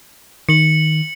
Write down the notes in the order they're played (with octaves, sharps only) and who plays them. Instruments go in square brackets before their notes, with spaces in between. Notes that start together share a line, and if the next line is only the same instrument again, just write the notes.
[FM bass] D#3 [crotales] C#7 F#7